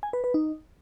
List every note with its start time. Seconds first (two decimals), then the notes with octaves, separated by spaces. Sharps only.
0.03 G#5
0.13 B4
0.24 B4
0.34 D#4